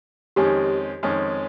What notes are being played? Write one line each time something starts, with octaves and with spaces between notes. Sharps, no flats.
F2 D#3 G#3 C#4 G4
F2 D#3 G#3 C#4